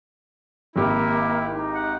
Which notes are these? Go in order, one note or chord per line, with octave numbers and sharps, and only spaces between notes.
G#1 A#3 E4 G4
D#4
F#5